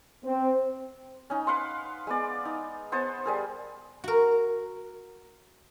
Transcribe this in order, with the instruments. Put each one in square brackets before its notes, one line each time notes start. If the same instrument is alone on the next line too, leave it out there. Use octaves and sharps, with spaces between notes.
[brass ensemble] C4
[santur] C#4 D#4
B4 F5 F#5 C6
G#3 B3 D5
D#4
B3 C5 F#5 A5
G3 G#4 A#4
[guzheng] F#4 A#4